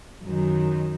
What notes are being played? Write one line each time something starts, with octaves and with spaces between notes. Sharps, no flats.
F#2 D#3